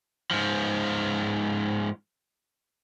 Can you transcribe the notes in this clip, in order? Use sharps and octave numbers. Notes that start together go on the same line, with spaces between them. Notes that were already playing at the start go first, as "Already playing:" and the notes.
G#2 F3